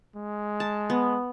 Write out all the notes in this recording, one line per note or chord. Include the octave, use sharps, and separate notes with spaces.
G#3
A5
B3